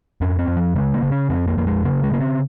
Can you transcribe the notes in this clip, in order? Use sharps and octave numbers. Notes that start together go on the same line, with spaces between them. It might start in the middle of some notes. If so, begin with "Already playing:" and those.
F2 C#4
C4
F2
F3
C#3 G#3
A#3
C#3
C#4
F2 C4
A#3
F2 A#3
G#3
C#3 A#3
G#3
C#3 A#3
C4